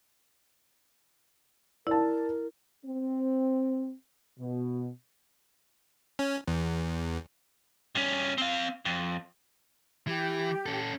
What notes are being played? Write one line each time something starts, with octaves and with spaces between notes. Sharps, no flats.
E4 A#4 D5 A5
C4
B2
C#4
E2
G2 C#4
C4 F5
F2
E3 G4
C#4 A4